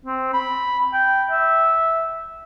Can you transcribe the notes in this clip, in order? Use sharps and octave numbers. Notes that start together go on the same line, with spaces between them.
C4
B5
G5
E5